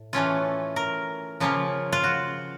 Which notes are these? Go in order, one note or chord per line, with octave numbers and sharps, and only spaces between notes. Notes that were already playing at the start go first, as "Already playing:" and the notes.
Already playing: A2
E3 A3 C#4 F4
A#4
C#3 F3 A#3 C#4 F4
F4
F#4